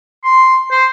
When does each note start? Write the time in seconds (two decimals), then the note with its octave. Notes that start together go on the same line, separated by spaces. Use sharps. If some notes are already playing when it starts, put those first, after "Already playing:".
0.24 C6
0.71 C5